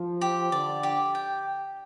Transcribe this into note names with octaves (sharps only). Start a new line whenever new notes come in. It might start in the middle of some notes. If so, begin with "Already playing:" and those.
Already playing: F3
G4
D3 D5
G4
G5